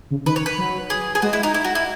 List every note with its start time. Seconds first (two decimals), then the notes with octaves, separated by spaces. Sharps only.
0.11 C#3
0.25 D#3 B4
0.36 C#5
0.46 B4
0.58 F#3
0.90 G#4
1.15 G#4
1.22 G#3 F#4
1.33 E4
1.43 D#4
1.54 E4
1.64 F#4
1.75 E4